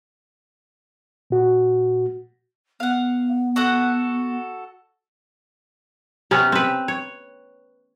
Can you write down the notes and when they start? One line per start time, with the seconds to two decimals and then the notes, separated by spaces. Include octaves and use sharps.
1.30 A#2 F#4
2.80 B3 F5 F#5
3.56 F#4 A4 F#5
6.31 C3 B3 C#4
6.52 C4 B4
6.88 C#5